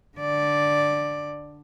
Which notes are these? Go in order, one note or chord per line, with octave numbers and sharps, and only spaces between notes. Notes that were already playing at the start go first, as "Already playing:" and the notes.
D3 D5